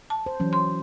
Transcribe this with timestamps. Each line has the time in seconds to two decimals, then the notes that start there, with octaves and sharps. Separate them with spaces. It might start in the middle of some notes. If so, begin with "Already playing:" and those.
0.10 A5
0.26 C5
0.40 E3 F#3 C#4
0.53 C6